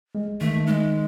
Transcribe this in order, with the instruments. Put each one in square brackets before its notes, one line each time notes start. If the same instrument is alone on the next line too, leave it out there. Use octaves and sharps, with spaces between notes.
[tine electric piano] G#3
[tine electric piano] D#3 [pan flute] A3
[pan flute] G#3 [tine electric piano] D#4